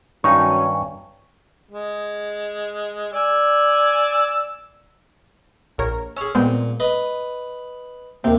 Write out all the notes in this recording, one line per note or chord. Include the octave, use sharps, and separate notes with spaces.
G2 D#3 F#3 C#4 D#4 C#5 G#5 C#6
G#3
D5 G#5 E6
A#1 A#4 C#5
C#4 G#4 E6 F6
A#2 G#3 B3 C4
B4 D#5
D#2 C3 A#3 C4